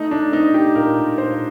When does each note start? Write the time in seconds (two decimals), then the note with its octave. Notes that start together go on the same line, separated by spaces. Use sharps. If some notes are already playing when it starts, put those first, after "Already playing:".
Already playing: A3 D#4
0.11 D4
0.32 C4 D#4
0.54 G4
0.75 A#2 A#4
1.18 A#2 C5